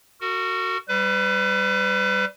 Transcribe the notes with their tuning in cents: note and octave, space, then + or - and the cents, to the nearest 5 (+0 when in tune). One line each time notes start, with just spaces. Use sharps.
F#4 +0 A#4 -40
G3 -10 B4 +30